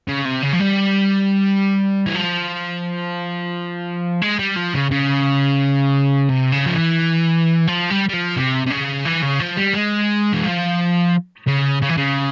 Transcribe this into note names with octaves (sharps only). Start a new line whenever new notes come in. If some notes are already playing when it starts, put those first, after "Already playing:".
C#3
C3
C#3
F3
G3
E3
F3
G#3
G3
F3
C#3
C#3
C3
C#3
F3
E3
F3
G3
G3
F3
C3
C3
C#3
E3
C#3
F3
G3
G#3
E3
F3
C#3
C#3
E3
C#3